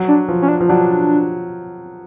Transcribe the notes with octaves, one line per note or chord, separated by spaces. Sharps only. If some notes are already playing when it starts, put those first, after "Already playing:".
Already playing: F#3
D4
F3
C#4
D4
F3
F#3 D4